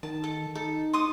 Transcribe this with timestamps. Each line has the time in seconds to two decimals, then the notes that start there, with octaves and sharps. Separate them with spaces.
0.03 D#3 A5
0.24 A4
0.55 D#4 A4
0.93 C6 D6 D#6